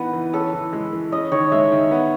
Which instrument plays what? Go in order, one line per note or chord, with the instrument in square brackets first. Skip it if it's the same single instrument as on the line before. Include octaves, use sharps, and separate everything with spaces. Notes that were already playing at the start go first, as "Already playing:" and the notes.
Already playing: [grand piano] E3 B3 D#4 [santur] B4
[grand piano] E3
[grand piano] C#4 [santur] A4
[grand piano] E3
G#3
E3
[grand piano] C#4 [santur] D#5
[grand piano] D#3 [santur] C#5
[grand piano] G#3 [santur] E5
[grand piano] D#3
B3